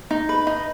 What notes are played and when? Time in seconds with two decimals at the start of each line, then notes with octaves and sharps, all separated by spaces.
0.11 D#4
0.29 B4
0.47 D#4